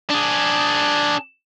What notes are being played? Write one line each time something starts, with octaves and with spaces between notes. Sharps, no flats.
D4 G#4